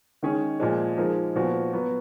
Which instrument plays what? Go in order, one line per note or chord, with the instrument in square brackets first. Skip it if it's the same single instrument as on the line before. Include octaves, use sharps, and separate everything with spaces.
[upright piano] D#3 G#3 C#4 G#4 C#5
A#2 F3 G#3
F3 G#3 D#4 A#4
A#2 F3 B3 F#4
F#3 B3 F#4